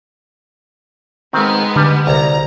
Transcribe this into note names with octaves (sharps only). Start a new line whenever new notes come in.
D#3 G#3 B3 C4
D3 G3
C2 A#5